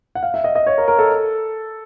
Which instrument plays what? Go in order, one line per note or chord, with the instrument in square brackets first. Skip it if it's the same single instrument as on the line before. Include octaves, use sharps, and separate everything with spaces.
[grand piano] F#5
F5
E5
D#5
D#5
C#5
A#4
A#4
A4